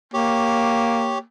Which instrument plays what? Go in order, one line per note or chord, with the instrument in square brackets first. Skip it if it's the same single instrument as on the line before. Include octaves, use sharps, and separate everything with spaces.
[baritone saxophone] A#3 [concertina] G4 C#5